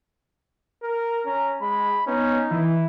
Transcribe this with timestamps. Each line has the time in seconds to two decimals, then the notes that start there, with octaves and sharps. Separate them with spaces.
0.83 A#4
1.26 C#4 A#5
1.61 G#3 B5
2.07 B3 C#4 D#4
2.51 E3 E4